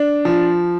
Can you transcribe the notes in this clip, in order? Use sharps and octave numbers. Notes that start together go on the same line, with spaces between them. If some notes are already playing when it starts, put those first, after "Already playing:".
Already playing: D4
F3